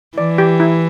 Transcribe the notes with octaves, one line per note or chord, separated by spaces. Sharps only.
E3 D5
G4
E4